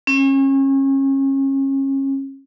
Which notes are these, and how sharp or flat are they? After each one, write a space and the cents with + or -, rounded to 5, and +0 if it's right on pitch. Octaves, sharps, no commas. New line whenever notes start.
C#4 -30